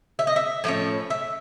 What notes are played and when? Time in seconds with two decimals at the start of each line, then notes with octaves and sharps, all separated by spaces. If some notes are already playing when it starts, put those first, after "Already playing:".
0.19 E5
0.27 D#5
0.36 E5
0.64 A2 F3 A#3 C#4
1.10 E5